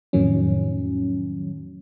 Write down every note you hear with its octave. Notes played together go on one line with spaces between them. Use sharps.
F2 A2 D#3 F#3 C#4